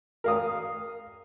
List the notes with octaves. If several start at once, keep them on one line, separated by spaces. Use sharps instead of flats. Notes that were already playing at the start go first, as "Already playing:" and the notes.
A#4 F5 D#6